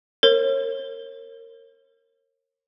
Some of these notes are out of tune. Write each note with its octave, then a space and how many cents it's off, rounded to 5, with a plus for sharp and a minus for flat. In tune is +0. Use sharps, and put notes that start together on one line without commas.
A#4 -20 C#5 -35